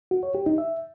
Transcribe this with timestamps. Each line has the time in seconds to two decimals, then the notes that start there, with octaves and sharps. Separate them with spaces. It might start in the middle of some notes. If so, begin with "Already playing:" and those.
0.11 F#4
0.23 C#5
0.35 G4
0.46 D#4
0.58 E5